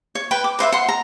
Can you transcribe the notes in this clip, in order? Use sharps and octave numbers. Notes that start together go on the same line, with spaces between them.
C#5
B4 G5 B5
D6
B4 C5 D#5 E5
F#5 C6
A#5